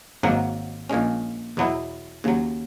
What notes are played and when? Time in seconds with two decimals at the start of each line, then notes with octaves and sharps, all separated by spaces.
0.23 G#1 G#2 F#3 A#3
0.89 A#1 A#2 G#3 C#4
1.57 E2 B2 F#3 B3 E4
2.24 D#2 C#3 F#3